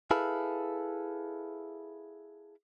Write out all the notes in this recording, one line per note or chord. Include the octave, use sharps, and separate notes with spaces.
E4 G#4 A4 B4 F5